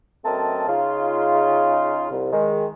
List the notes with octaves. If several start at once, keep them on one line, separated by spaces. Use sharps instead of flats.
F#2 A3 C4 A#4 D#5 A5
C#3 D#4 F4
C2
D#3 G#3